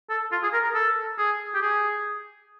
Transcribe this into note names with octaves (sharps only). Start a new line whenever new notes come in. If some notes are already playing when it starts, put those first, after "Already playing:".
A4
F4
G#4
A#4
A#4
A4
G#4
G4
G#4